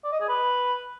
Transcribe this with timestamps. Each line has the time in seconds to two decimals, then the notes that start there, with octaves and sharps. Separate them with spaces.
0.04 D5
0.12 D#5
0.20 G#4
0.28 B4